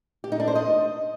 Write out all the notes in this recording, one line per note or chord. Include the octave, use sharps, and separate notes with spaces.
G4
D#4
D4
C5
D#5